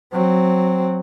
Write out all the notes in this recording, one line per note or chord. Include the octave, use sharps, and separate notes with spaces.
F#3 C4